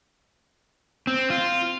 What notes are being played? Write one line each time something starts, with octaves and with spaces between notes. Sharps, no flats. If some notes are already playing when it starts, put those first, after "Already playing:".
C4
F4